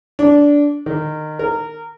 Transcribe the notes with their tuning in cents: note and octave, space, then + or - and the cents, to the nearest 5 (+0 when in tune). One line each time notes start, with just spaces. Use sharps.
D4 -15
D#3 -20
A#4 -20